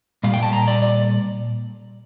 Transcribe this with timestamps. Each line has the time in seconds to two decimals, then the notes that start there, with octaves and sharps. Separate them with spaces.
0.24 A#2 G3 F5
0.34 G5
0.43 A5
0.53 A#5
0.68 D5
0.82 D5